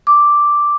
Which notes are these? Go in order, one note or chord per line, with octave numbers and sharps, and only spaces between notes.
D6